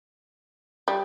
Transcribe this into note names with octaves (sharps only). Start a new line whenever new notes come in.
G3